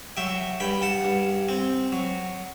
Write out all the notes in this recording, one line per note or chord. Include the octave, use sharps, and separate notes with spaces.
F#3 E5 G5
G2 G5 B5
F#5 A5
G2
C4
F#3